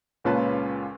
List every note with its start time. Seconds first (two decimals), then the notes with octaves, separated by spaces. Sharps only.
0.24 C#2 A#2 C#4 F4 B4 A5